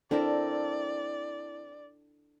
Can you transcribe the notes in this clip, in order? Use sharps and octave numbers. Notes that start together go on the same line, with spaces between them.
C4 D4 E4 A4 A#4 D5